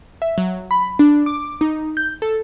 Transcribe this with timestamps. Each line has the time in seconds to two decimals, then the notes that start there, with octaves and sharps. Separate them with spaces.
0.22 E5
0.38 F#3
0.71 B5
0.99 D4
1.26 D6
1.61 D#4
1.97 G6
2.22 A4